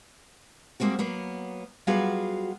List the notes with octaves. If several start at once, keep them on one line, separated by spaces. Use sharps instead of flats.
G3 G#3 A#3 C4 F#4
F#3 A#3 B3
F#3 G3 B3 F4 F#4 G#4